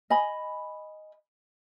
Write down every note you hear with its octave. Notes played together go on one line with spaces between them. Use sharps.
D#5 G#5 B5